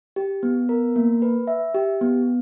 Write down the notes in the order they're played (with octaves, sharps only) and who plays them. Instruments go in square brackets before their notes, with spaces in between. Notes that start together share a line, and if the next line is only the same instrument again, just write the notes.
[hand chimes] G4
B3
A#4
A#3
B4
E5
G4
B3